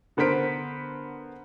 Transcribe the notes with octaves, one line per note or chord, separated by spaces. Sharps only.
D3 B3 A#4 C5 B6 D7